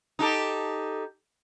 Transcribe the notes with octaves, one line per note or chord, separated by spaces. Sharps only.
D#4 G4 A4